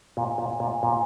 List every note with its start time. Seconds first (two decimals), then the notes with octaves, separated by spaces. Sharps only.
0.17 A#2
0.38 A#2
0.60 A#2
0.83 A#2